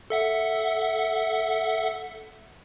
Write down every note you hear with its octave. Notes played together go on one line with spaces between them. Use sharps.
A4 E5 F#5